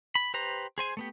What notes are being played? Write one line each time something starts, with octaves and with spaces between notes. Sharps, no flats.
B5
G4 B4 C5 A#5
G#4 C5 G#5
A3 B3 G4